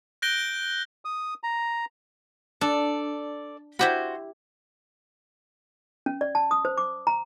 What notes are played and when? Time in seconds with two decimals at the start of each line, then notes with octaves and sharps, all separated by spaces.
0.22 F#6 G6 A#6 D7 G7
1.05 D#6
1.43 A#5
2.61 D4 A4 D5
3.79 E4 F#4 G4 C5 B5
6.06 C#4
6.21 D5
6.35 A5
6.51 D#6
6.65 C5
6.78 D6
7.07 A#5